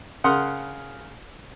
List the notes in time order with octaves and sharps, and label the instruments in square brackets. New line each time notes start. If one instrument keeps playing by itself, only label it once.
[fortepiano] C#3 A#4 F#5 C6 D#6